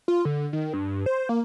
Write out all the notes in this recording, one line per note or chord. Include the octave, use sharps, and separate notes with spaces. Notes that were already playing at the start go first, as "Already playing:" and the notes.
F4
D3
D#3
G2
C5
A#3